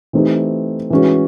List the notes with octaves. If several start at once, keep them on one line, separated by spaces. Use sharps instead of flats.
E3 A3 C4 D#4 G4
E3 G#3 C#4 F#4